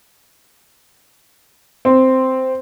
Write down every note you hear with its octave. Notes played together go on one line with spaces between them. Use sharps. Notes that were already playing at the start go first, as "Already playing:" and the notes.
C4